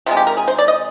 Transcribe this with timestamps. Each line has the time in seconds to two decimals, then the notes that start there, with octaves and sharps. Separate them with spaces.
0.06 C3 F3 G#3 F4
0.17 G4
0.27 A#4
0.37 G#4
0.48 C5
0.58 D5
0.68 D#5